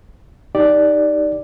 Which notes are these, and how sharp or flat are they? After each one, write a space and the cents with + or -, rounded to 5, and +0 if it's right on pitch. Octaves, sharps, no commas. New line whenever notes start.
D#4 +0 G4 +0 D5 +0